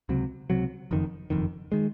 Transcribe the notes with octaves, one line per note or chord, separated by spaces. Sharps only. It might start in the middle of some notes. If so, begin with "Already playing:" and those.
C#2 C3 F#3
C#2 C3 F#3
F#1 F2 D#3
F#1 F2 D#3
D#3 G#3